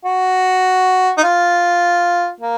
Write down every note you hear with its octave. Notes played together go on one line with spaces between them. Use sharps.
F#4
D#4
F4
A#3